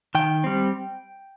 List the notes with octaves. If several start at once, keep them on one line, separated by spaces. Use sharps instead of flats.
D#3 G5
G3 C4